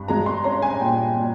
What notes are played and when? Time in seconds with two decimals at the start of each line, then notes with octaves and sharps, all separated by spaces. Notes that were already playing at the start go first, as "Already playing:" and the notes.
Already playing: G2
0.08 G#3 A#5
0.26 C6
0.44 C#4 A#5
0.62 G#5
0.80 A#2 G5
1.16 A#2